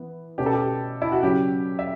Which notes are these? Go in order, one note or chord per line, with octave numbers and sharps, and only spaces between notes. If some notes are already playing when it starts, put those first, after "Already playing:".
Already playing: E3 B3
B2 A3 C#4 G4
A4
G4
E4
F#4
C#3 F#3 C#4 G4
E5